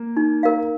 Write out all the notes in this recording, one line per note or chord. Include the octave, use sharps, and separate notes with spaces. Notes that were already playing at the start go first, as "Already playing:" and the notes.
Already playing: A#3
D#4
A#4 F5